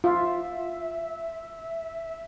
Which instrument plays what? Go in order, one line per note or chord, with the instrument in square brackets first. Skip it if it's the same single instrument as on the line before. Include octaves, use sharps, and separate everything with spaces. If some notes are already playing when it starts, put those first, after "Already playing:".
[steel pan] F4 [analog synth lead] E5